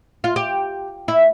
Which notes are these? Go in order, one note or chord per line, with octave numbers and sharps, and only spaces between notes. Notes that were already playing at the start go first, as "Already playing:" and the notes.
F4
G4
E4